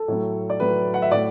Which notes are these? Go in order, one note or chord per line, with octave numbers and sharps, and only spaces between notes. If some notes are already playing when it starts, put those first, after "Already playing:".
Already playing: A4
A2 F#3
D5
A2 F#3 B4
F#5
E5
A2 F#3 D5